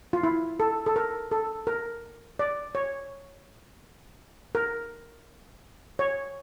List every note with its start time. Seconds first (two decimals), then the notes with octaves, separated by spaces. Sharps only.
0.13 F4
0.23 E4
0.60 A4
0.86 A4
0.96 A#4
1.31 A4
1.67 A#4
2.39 D5
2.75 C#5
4.55 A#4
5.99 C#5